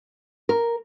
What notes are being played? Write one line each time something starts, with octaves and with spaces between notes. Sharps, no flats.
A#4